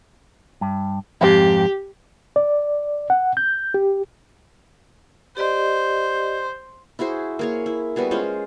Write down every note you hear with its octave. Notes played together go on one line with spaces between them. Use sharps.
G2
F2 G#2 C4 G4
D5
F#5
G6
G4
G4 C5 D5 D#5
E4 F#4 G#4 C5
A#3 G#4 C#5
E4
G3 B3 F#4 G#4
G#3 C#4 F4 C5